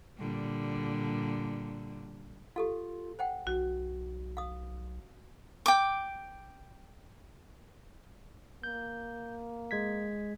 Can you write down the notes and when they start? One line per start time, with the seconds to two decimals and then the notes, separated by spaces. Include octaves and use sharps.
0.18 A#2 D3 G3
2.56 F4 G4 A4 F5
3.19 C5 F#5 G5
3.47 B1 F#4
4.37 F5 D#6
5.66 G5 D6
8.64 A#3 G6
9.71 G#3 G#6 B6